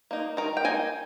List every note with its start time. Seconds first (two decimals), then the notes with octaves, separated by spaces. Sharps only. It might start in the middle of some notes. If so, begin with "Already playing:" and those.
0.11 A#3 D#4
0.37 D#3 A#4
0.57 G5
0.64 A#3 D#4 G#5